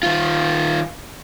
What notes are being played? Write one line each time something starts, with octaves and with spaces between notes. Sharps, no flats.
D#3 F4